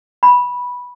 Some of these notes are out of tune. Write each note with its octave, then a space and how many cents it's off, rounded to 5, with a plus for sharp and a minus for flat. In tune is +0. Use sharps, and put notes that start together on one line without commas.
B5 -10